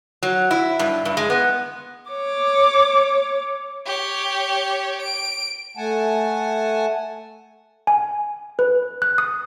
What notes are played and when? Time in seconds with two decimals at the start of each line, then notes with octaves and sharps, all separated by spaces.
0.23 F#3
0.51 E4
0.79 G2
1.05 G2
1.17 G#3
1.30 B3
2.10 C#5 D6
3.86 G4 C#5
5.01 D7
5.77 A3 F#5 G#5 A5
7.87 G#5
8.59 B4
9.02 F#6
9.18 D#6